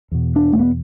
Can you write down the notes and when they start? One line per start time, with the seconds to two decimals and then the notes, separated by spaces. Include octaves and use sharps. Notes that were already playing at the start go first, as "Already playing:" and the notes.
0.12 E2 B2
0.36 D4
0.53 A3
0.59 B3